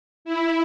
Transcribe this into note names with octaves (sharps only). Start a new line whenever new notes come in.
E4